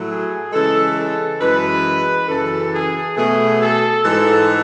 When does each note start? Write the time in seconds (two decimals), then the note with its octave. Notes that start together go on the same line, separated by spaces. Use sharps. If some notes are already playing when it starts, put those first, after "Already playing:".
Already playing: A2 F#3 A3
0.08 G#4
0.52 C#3 E3 G#3 A4
0.97 A4
1.40 F#2 E3 G#3 B4
2.28 F#2 C#3 E3 A4
2.72 G#4
3.16 B2 A3 G#4
3.60 A4
4.03 G#2 E3 G#3 A4